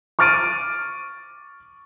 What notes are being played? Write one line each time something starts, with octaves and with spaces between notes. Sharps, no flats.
C#6 D6 F6 A6 D7 D#7